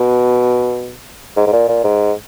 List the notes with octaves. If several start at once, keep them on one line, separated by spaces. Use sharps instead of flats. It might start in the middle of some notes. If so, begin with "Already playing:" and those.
Already playing: B2
G#2
G#2
A#2
A#2
G#2